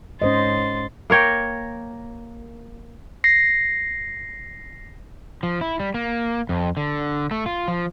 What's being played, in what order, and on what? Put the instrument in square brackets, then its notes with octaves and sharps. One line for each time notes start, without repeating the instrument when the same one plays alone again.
[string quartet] G#2 C6 A6 [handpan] C#4 C5 D#5
[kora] A#3 A#4 C#5 G5
[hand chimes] A#6 C7
[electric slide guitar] F3
E4
G3
A#3
F2
D3
A3
F4
F3